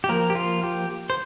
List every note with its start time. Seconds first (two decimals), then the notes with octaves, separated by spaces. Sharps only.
0.04 G4
0.09 F3 A#3 A#4
0.30 G4
0.35 F4
0.63 G4
1.10 C5